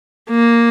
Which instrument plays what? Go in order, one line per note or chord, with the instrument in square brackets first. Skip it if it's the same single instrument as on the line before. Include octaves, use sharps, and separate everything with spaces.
[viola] A#3